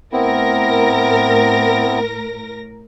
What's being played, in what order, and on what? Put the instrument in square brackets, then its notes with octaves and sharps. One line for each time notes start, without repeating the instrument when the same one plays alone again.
[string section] A2 A#4 A#6 [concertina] B3 C4 E4